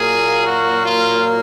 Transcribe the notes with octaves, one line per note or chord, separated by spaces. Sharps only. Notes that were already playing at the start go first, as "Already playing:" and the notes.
Already playing: A#2 F#3 A#3 G#4
F#4
F4